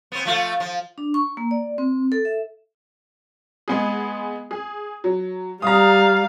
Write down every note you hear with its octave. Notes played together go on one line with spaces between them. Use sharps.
B3 C4
F3 A3 F4
F3
D4
C#6
A#3
D5
C4
A4
E5
G#3 B3 G#4
G#4
F#3
G3 F5 A#5 D#6